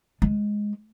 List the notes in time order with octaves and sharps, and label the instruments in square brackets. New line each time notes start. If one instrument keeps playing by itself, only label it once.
[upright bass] G#3